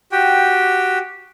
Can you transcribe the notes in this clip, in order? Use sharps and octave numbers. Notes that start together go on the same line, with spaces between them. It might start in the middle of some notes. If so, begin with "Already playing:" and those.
F#4 G4 G5